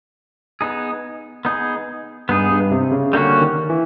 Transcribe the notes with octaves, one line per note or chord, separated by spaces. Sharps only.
B3 D#4 G#4
B3 D#4 G#4
G2 B3 D#4 G#4
G2
C3
C#3
D3 G3 A#3 C#4 F#4
D#3
E3